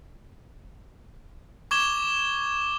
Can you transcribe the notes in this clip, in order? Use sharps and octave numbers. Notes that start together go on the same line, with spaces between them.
C#6 D6 G#6 E7 G7